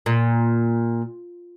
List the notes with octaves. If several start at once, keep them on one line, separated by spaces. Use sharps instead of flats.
A#2